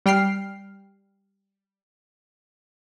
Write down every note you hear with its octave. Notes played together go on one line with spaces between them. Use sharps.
G3 G5 F6 C7